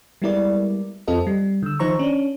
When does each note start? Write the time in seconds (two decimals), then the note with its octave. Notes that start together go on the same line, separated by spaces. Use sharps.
0.22 G3 G#3 B3 E4 A#4 D5
1.08 F2 C4 F4 A4 D#5
1.27 G3
1.63 D3 E6
1.79 D#3 F3 D#4 C5 A#5 C#6
1.99 C#4 D4